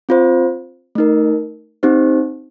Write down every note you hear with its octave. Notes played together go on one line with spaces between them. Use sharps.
C4 F4 C5
A3 D#4 A#4
C4 D#4 G4 C5